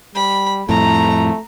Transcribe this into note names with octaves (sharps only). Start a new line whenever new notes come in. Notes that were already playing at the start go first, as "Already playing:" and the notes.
G3 B5
F2 A2 A3 A#5